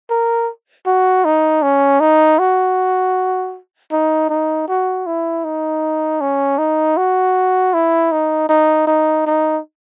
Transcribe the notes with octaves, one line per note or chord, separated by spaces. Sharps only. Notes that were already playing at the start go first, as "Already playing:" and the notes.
A#4
F#4
D#4
C#4
D#4
F#4
D#4
D#4
F#4
E4
D#4
C#4
D#4
F#4
E4
D#4
D#4
D#4
D#4